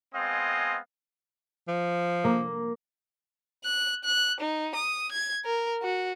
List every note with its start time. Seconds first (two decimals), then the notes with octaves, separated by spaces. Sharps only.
0.15 G#3 B3 C4 D#5 F5 G#5
1.68 F3
2.24 A#3
3.64 F#6
4.04 F#6
4.40 D#4
4.75 D#6
5.12 G#6
5.45 A#4
5.82 F#4